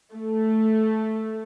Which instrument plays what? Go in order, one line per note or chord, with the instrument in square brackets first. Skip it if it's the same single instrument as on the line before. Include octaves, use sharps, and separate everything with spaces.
[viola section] A3